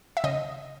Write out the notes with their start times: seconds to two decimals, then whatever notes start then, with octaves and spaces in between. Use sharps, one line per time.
0.17 E5
0.24 C#3 D#5